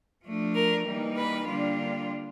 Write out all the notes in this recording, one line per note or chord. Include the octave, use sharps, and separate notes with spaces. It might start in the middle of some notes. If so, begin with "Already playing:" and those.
F3 A3 D4
A#4
E3 G3 A#3 D#4
B4
D3 G3 A#3 D4 F4